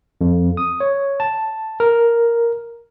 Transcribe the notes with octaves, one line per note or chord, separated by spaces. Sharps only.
F2
D#6
C#5
A5
A#4